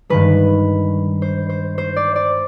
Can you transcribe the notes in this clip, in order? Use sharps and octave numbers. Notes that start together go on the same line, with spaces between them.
G2 D#3 G#3 B4
C5
C5
C5
D5
D5